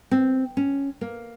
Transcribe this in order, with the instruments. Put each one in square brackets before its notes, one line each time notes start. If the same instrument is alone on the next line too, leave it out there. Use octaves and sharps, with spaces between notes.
[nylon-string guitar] C4
C#4
A#3